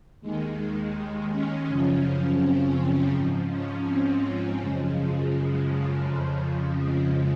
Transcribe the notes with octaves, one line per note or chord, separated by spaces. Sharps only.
D#2 D#3 G#3
C#4
F#2 C#3 F3
C4
G#2 F3
C#4
C4
F#2 C#3 F3 G#3
F3
F3
F3
F2 C#3 F3
G#3